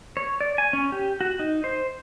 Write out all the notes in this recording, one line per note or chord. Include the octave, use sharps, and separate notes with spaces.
C#5
D5
G#5
C#4
G4
F#4
D#4
C5